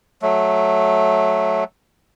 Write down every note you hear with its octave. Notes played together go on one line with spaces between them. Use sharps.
F#3 A3